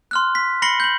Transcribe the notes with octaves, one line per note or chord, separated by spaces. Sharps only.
C6 F6 F#6
B6
B5 A#6 C7 C#7 F#7 G7
G6 F#7